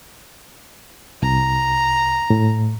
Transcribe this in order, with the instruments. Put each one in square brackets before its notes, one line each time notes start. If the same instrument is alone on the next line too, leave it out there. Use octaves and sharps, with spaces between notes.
[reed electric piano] C2 [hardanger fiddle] A#5
[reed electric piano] A2